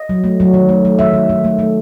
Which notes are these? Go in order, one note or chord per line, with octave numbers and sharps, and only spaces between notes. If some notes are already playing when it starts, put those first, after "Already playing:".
Already playing: D#5
F#3
A3
F#3
D#3
A3
A3
D#3 E5
D#3
D#3
A3
A3